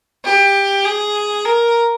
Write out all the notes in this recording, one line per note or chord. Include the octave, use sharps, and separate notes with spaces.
G4
G#4
A#4